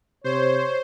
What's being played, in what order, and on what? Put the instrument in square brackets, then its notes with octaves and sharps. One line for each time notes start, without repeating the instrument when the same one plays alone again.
[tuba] C3 [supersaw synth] C5 [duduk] C#5